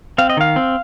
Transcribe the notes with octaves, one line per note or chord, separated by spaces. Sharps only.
C4 F5
D#5
D#3 F5
C4